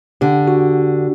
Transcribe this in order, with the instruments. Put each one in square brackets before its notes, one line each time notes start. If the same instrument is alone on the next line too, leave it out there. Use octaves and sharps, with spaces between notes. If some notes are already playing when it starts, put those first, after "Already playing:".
[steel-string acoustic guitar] D3 [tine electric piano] G4
[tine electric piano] F#4